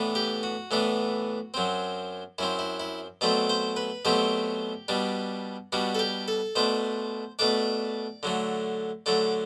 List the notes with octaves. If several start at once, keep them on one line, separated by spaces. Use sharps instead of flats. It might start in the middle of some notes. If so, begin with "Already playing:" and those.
Already playing: A2 E3 B3 D4
G4
F#4
A2 E3 B3 D4
F#2 F#3 C4
F#2 F#3 C4 E4
E4
E4
B2 F#3 A3 C4 D5
C5
B4
B2 F#3 A3 C4 G4
B2 G3 D4
B2 G3 D4 F#4
A4
G4
A4
B2 A3 D4 C5
B2 A3 D4 D5
D3 F#3 A3
D3 F#3 A3 D5